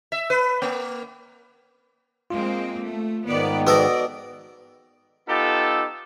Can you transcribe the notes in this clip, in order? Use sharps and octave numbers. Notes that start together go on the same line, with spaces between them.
E5
B4
A#3
G#3 A#3 C4 F4
A3
G#2 D#3 B3 D5
B3 F#4 A4 D5 D#5
B3 D#4 F4 G4 A4